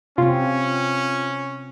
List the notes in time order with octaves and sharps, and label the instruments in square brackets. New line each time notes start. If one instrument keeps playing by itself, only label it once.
[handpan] C3 C4 [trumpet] C#4 [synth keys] F4